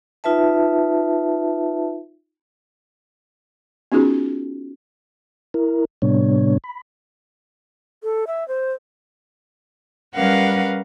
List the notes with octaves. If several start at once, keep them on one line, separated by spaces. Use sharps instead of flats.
D#4 F4 B4 E5 A5
B3 C#4 D#4 F4 F#4 G#4
E4 A#4
A2 C3 G3 B3 D4 C#5
B5
A4
E5
C5
G3 C#4 A#4 B4 F5 F#5